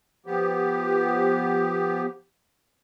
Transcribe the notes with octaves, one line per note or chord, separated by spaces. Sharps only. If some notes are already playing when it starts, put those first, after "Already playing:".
F3 B3 G4